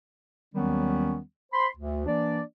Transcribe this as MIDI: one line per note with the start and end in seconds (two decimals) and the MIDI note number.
0.54 1.19 39
0.54 1.19 51
0.54 1.19 54
0.54 1.19 55
0.54 1.19 59
0.54 1.19 61
1.52 1.67 72
1.52 1.67 83
1.52 1.67 84
1.77 2.04 38
2.06 2.40 52
2.06 2.40 58
2.06 2.40 62
2.06 2.40 74